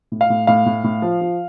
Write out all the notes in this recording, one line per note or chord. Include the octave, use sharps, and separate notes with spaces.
A2
F5
A2
A2 F5
A2
A2
F3
F3